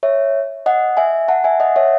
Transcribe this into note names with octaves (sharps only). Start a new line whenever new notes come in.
C#5 E5
D#5 F#5
E5 G#5
F#5 A5
E5 G#5
D#5 F#5
C#5 E5